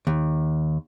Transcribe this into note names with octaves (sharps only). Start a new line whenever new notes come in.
D#2